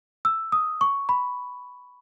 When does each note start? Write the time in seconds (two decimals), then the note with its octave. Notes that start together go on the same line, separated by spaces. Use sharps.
0.25 E6
0.52 D#6
0.81 C#6
1.09 B5